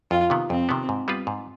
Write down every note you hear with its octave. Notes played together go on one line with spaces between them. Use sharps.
F2 F4
C3 D#3 B3
F2 C4
C3 D#3 B3
G#2
G3 B3 F4 B4
G#2